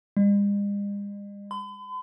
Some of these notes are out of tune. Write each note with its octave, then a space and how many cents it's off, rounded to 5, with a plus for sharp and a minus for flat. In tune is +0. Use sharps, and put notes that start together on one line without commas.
G#3 -45
B5 +45